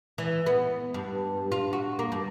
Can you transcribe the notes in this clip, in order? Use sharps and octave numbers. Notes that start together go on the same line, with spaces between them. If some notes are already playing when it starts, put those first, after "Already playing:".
E3
B3
G2
F4
F#4
A#3
G2